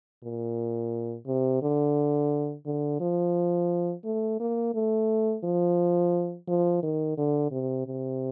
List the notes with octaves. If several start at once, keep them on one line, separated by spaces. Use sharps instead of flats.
A#2
C3
D3
D3
F3
A3
A#3
A3
F3
F3
D#3
D3
C3
C3